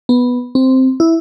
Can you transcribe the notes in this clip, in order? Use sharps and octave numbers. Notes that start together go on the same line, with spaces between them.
B3
C4
E4